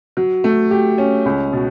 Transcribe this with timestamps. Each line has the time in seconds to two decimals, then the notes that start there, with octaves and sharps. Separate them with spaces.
0.17 F#3
0.44 A3
0.71 G4
0.98 C#4
1.26 C#2
1.53 B2